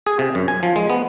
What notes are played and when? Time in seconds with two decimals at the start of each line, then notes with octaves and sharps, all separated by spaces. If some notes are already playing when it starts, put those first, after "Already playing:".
0.07 G#4
0.19 C3
0.35 F#2
0.48 G#5
0.63 F3
0.76 G#3
0.90 B3